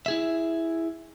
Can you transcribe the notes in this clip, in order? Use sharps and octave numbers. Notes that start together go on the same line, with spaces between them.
E4 G#4 E5